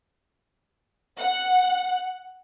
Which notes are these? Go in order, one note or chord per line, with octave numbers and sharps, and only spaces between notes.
F#5